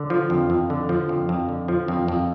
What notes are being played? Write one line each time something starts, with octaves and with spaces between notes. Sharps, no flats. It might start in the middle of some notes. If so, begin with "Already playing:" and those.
Already playing: D3
F3
F2
F2
D3
F3
F2
F2
D3
F3
F2
F2